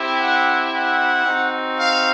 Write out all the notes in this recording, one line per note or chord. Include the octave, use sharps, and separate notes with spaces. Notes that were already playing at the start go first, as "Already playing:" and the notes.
Already playing: C4 E4 G4
F#5
F#5
C4 D#4 F#4
F5